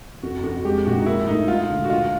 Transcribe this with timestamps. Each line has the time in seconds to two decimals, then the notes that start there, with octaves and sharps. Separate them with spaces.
0.23 F2 F#4
0.43 F2 F#4
0.64 G#3 G4
0.86 A#1 F#4
0.99 D#4
1.06 A#3 E4
1.27 A2 D#4
1.48 G#3 F4
1.70 D2
1.84 F#4
1.89 A#2 F4